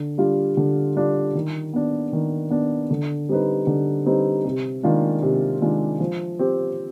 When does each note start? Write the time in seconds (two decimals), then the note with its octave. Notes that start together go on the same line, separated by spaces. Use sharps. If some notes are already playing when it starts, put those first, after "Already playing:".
Already playing: D3
0.18 G3 D4 F4
0.57 D3
0.96 G3 D4 F4
1.35 D#3
1.73 B3 D4
2.13 D#3
2.50 B3 D4
2.90 D3
3.29 G3 C4 D#4 B4
3.67 D3
4.06 G3 C4 D#4 B4
4.44 C3
4.83 D#3 G#3 D4 F4
5.22 C3
5.61 D#3 G#3 D4 F4
6.00 F3
6.39 C4 G4